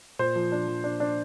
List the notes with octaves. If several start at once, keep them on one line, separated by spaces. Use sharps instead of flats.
A#2 C5
F3
D4
F3
D4
D4